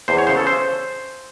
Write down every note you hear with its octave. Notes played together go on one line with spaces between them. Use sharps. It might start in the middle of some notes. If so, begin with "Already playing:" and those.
E2 C5
C#5
C#3 C5
A4
C5